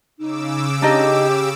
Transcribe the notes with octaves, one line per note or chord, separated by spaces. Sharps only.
C#3 D#4 D6 E6
D4 D#4 G4 D#5